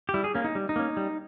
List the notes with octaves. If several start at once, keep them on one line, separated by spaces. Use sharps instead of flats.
G4
G3 E4
G#4
A#3 C#4
D#4
G3
D#4
A#3 C#4
G3